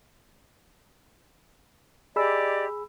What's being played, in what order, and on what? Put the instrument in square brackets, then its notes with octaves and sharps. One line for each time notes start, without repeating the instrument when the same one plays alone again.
[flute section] G4 D5 D#5 [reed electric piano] G#4 B5 E6